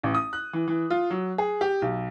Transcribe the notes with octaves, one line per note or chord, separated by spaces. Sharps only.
A1
D#6
F#6
E3
E3
F4
F#3
G#4
G4
B1